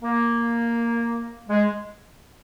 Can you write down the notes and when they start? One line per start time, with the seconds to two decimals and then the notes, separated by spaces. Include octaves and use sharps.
0.02 A#3
1.49 G#3